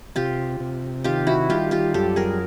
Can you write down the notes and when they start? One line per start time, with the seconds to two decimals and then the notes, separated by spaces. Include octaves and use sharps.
0.16 C3 F4 G4
0.60 C3
1.04 D#3 F4 G4
1.27 E4 F#4
1.49 G3 F4 G4
1.71 F4 G4
1.94 F#2 G4 A4
2.16 G#4 A#4